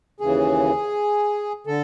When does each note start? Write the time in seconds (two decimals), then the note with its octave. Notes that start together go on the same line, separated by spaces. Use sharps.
0.20 D#2 C#3 E3 G#4
1.67 D3 A4